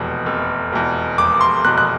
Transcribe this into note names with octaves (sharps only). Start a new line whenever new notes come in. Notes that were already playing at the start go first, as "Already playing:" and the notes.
Already playing: F1 E2 B2
F1
E2 B2
F1 D6
C6
E2 B2 F#6
F#6